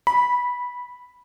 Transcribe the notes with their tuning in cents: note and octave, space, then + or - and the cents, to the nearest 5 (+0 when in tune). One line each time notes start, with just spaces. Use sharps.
B5 -10